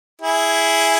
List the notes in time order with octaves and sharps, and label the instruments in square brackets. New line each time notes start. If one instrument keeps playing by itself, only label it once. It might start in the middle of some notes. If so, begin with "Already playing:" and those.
[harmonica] E4 G#4